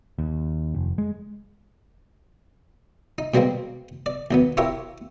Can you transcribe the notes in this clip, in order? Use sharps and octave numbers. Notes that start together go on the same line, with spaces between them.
D#2
F1
G#3
D#4
B2 G3 G#3 A#3 C4
D5
D#2 F#3 B3
E4 F4 G4 A#4 C#5 E5